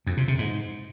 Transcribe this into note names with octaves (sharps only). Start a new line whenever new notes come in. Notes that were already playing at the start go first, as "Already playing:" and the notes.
F2
C3
C3
G#2